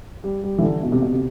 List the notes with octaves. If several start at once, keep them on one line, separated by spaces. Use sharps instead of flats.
G3
G3
E3
D3
B2
C3
B2
C3